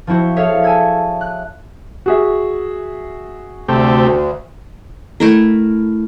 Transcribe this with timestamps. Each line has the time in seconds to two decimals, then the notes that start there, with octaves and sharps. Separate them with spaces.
0.07 F3 C4 E4 F#4 C5
0.36 G#4 A4 C#5 E5 F5
0.64 G#5 A5 E6 G#6
1.21 F#6
2.06 F#4 G#4 E5
3.68 D2 C3 A3 G4
5.20 A3 E4 A#4